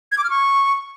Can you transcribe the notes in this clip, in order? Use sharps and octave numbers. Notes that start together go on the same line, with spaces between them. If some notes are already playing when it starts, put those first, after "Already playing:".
G#6
D6
F6
C#6